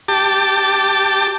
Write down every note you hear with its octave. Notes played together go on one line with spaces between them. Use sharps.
G4 A5 D6